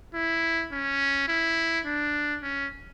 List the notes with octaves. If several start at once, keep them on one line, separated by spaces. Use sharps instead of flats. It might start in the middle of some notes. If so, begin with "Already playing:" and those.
E4
C#4
E4
D4
C#4